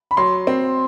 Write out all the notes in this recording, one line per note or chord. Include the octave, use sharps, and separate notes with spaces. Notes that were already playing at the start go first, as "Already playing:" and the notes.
B5
F#3 C6
C4